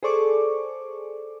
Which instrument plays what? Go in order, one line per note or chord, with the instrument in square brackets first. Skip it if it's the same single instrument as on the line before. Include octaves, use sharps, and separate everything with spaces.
[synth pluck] G#4 A4 C5 D5 C#6 D6